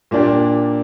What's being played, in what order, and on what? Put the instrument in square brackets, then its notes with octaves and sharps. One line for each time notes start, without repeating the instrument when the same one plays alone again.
[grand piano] A#2 A#3 D4 G4